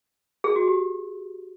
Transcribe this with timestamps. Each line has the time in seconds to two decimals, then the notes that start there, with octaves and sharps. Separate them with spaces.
0.44 G#4
0.56 F#4
0.67 G4